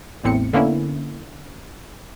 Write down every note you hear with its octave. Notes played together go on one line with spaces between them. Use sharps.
A1 E2 A2 C4 C#7
D3 A#3 B3 C#4 E4